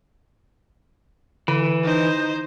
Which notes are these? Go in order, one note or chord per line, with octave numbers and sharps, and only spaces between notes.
D3 E3
D#4 C5